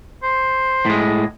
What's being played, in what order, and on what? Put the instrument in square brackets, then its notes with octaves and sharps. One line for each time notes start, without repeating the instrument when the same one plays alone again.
[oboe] C5
[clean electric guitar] A2 G#3